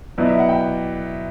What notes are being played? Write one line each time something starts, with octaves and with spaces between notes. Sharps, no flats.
B2 F#3 B3 E4 D5
E5
F#5
G5